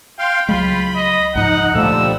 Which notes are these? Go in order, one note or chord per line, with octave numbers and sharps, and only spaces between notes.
F5 G5 C6
C#2 F#3 G#3 F4 B5
D#5
C#2 G#2 F3 D#4 F#5
C#2 A#2 D3 F3 G3 A3 E6